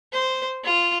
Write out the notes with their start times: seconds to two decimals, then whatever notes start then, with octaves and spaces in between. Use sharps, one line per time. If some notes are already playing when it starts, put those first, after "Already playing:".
0.13 C5
0.65 F4